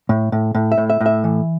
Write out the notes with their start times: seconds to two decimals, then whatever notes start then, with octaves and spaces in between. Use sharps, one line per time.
0.09 A2
0.32 A2
0.55 A2
0.72 E5
0.78 A2
0.90 E5
1.01 A2
1.06 E5
1.24 E3